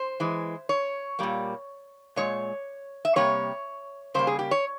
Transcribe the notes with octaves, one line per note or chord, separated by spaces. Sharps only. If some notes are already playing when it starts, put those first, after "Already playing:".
Already playing: C5
E3 G#3
C#5
A#2 G3 A#3
A#2 G#3 C#5
E5
C3 G3 A#3 C#5
C#3 G3 A#3 C5
G#4
G4
C#5